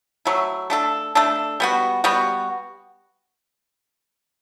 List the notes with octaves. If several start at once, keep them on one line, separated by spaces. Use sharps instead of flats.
F#3 A3 E4
A3 D4 A4
A3 D4 A4
G3 B3 F#4
G3 B3 F#4